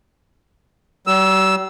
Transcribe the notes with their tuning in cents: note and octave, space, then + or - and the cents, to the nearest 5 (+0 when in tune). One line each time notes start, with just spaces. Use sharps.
G3 -45 E6 +0